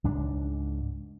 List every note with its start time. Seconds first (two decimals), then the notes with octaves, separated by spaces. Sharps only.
0.04 C#2 G#2 D4